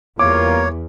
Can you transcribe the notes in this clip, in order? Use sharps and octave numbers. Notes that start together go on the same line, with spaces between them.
E2 G3 A#3 F4 A#4 C#5 D6